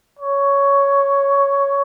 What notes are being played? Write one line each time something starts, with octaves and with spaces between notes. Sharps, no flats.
C#5